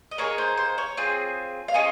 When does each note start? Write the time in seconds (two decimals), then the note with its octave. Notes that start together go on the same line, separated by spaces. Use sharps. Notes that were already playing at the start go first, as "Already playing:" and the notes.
0.11 D#5
0.18 A#3 D#4 G#4 C#5
0.38 C5
0.57 C5
0.78 C#5
0.97 C4 F4 G#4
1.68 F5
1.74 C#4 F4 G#4 D#5